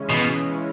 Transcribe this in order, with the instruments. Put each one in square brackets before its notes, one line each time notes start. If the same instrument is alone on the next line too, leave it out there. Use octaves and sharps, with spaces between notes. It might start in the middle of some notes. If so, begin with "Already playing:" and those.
Already playing: [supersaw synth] C#3 E3 G#3 C#4
[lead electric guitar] B2